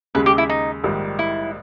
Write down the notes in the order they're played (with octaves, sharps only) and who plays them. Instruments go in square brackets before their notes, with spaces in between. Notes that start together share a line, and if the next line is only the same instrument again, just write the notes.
[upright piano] D#2 C#3 G#3 [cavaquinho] B4
[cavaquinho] G4
E4
D#4
[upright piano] A#1 G#2 D#3 G3
[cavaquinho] E4